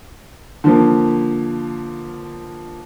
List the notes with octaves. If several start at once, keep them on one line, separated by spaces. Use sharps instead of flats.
D3 F3 A#3